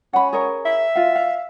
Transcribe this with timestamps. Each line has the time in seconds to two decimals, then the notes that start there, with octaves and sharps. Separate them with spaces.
0.13 C#4 F#5 B5
0.33 G#4 A#4 C#5
0.65 E5
0.95 F4 F5
1.15 F5